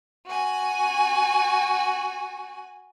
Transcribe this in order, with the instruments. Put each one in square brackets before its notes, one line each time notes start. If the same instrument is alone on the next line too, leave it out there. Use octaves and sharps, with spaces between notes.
[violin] F#4 G#5